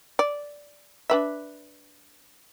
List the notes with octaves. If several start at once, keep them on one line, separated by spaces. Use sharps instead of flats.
D5
D4 B4 E5